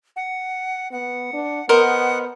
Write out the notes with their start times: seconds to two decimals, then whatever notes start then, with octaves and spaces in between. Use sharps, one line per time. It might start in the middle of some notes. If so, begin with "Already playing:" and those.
0.16 F#5
0.92 B3 F#5
1.33 D4
1.69 B3 A#4 C5 D#5 F#5